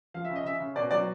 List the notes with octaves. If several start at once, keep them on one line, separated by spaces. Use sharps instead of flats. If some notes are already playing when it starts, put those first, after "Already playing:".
F3 F5
E5
C#3
D#5
C#3 E5
C#3
B2 D5
F#3 D5